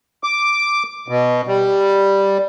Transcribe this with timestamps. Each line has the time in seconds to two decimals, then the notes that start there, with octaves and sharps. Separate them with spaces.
0.23 D6
1.08 B2
1.47 G3